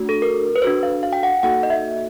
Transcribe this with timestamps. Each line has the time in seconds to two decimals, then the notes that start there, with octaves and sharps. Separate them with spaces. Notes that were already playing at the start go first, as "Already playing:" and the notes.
Already playing: A3 D4 F#4
0.09 A4
0.22 A#4
0.56 B4
0.62 D4 F#4 A4 C5
0.83 F5
1.03 F5
1.13 G5
1.23 F#5
1.43 A#3 D#4 F#4 A4 F#5
1.63 D#5
1.70 E5